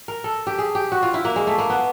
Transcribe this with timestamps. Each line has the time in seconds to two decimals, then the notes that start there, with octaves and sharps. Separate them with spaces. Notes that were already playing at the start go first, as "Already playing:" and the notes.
0.08 A#4
0.24 A4
0.47 G4
0.58 G#4
0.75 G4
0.92 F#4
1.03 F4
1.14 E4
1.25 A#3
1.36 G#3
1.47 A3
1.58 A#3
1.70 B3